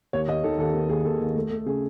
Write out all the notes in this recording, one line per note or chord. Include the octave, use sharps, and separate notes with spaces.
D#2 C#5
D#2 D#5
D#3 A4
D#2 A4
D#2
D#2 G#4
D#2 A4
D#2
A3
A3
C#3 G#4